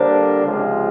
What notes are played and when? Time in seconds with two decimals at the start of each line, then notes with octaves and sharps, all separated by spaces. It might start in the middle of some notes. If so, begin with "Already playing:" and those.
Already playing: D3 G3 A#3 D4 C5
0.44 C#2 C3 F3 G#3